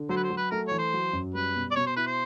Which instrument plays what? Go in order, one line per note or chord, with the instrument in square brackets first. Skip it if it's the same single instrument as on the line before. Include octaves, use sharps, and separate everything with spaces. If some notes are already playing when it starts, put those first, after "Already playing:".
Already playing: [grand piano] D3
[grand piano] F#3 [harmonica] C5
[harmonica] B4
C5
[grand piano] F#3
[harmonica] B4
[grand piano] A3 [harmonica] A#4
[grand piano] E3 [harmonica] C#5
[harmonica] C5
[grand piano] F#3
F#2
[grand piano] G3 [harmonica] B4
[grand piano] B2
[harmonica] D5
[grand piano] B2 [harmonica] C#5
[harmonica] C5
[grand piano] E4 [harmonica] B4
[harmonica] C5